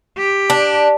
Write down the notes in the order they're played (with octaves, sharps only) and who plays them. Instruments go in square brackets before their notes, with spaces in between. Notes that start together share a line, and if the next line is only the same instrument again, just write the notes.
[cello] G4
[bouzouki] D4